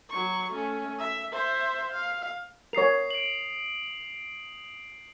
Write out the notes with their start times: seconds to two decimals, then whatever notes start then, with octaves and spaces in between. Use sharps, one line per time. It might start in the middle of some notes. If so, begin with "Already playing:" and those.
0.10 F#3 C#6
0.52 A3 C#4
0.99 E5
1.32 C5 E5
1.91 F5
2.73 A#4 C#5 D#6 C7 F7
3.11 D7 F#7